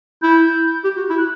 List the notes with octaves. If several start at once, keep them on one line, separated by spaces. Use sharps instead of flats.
E4 G6
G4
F#4
E4
F#6